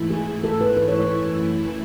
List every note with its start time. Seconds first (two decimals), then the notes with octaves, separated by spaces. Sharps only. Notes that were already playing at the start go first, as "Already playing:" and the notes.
Already playing: G#2 E3 A3 E4
0.11 G#4
0.44 A4
0.61 B4
0.77 B4
0.88 C#5
1.00 C#5
1.11 F#2 E3 A3 E4